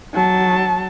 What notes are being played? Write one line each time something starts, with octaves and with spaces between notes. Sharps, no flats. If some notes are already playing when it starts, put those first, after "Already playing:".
F#3 A5